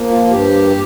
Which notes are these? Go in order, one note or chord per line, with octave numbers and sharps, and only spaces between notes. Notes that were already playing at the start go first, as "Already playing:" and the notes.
Already playing: F3 A#3
F4
G2 G4